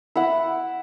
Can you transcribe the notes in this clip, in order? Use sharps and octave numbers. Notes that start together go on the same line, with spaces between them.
E4 F#5